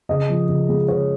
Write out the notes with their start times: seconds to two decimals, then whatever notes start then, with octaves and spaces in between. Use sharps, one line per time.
0.09 C#3 D#5
0.29 F3
0.49 C#3
0.69 G#3
0.88 C#3 C#5